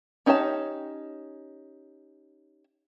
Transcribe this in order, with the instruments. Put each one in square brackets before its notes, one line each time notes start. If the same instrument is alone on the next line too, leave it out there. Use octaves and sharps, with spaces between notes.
[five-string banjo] C#4 D#4 G4 C#5 A5